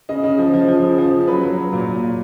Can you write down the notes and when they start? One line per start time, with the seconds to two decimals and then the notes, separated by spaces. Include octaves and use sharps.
0.09 C#3 D#5
0.24 C#3
0.39 F3
0.54 F3
0.68 F3
0.84 C#3
0.98 F3
1.13 C#3
1.27 F#3 B4
1.43 F#3
1.58 F#3
1.73 A#2
1.88 A#2
2.03 A#2